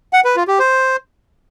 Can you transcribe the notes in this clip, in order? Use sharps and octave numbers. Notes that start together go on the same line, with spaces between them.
F#5
B4
F4
G4
C5